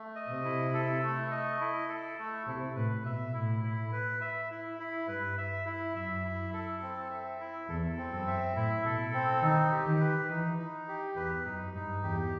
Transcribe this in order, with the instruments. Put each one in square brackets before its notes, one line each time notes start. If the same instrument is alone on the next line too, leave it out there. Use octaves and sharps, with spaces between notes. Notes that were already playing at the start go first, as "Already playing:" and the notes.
Already playing: [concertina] A3
D#5
[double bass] C3
[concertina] E4
A4
A3
D#5
E4
A4
A3
[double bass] C3 [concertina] E4
[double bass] A2 [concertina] B4
[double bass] B2 [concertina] E5
[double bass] A2 [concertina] E4
[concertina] E4
B4
E5
E4
E4
[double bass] G2 [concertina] B4
[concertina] E5
E4
[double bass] F#2 [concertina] E5
[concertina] E4
A4
C4
E5
E4
[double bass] E2 [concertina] A4
[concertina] C4
[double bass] F#2
[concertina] E5
[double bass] A2 [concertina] E4
[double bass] B2 [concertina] A4
[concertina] C4
[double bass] D#3 [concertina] D#4
[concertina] G4
[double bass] D#3
[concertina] B4
[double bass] E3 [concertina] D#4
[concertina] D#4
G4
[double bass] E2 [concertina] B4
[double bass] F#2 [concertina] D#4
[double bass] G2 [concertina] D#4
[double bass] E2 [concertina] G4